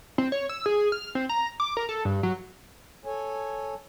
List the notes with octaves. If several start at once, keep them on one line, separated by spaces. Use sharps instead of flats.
C4
C#5
E6
G#4
F6
C4
A#5
D6
A#4
A4
G2
F#3
A4 C#5 G#5